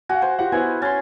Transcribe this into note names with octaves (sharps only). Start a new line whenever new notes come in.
F#4 F5 G#5
C5 G#5
F4 G4 F#5
B3 E4 C5 G#5
C#4 C6 A6